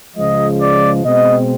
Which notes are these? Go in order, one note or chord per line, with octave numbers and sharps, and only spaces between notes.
C#2 C#3 F3 G#3 D#5
D5
B2 G#3 C4 D#5